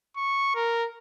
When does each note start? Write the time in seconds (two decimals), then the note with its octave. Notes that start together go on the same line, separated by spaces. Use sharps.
0.17 C#6
0.55 A#4